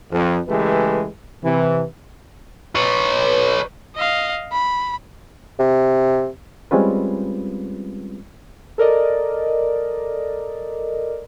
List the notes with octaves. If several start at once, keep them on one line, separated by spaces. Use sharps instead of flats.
F2
C#3 E3 G#3 A3 G4 B4
C3 E3
B4 C#5
D#5 F5
B5
C3
G3 G#3 C4 C#4 F4 B4
A4 A#4 D5 D#5